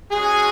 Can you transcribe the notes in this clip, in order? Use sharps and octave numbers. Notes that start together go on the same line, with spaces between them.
G#3 C#4 F#4 G#4